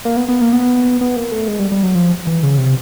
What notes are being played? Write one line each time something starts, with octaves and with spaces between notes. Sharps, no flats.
A#3
B3
B3
A#3
B3
B3
A#3
A3
G#3
G3
G3
F#3
F3
E3
C#3
C3